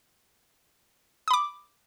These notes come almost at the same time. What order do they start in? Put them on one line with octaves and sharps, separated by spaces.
D#6 B5 D6